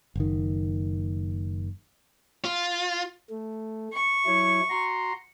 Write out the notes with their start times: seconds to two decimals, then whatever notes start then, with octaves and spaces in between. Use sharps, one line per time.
0.15 F#1 D#3
2.45 F4
3.30 A3
3.93 C#6
4.26 F#3 E4 C#5
4.70 F#4 A#5 C6